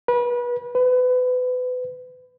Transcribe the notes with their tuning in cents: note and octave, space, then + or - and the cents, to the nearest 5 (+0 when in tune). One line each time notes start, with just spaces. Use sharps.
B4 -30
B4 +30